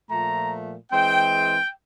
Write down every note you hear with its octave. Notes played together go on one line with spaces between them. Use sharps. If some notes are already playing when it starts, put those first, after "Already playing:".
A#2 F3 A3 A#5
E3 G#3 C4 G5